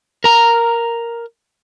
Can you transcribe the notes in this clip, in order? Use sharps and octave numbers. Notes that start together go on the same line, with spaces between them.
A#4 A#5